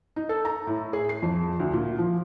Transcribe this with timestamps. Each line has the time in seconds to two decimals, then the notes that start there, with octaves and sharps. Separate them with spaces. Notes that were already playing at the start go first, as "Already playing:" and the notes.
0.16 D#4
0.29 A4
0.45 A#5
0.67 A2
0.93 G#4
1.09 C7
1.22 F2
1.60 D2
1.73 A#2
1.99 F3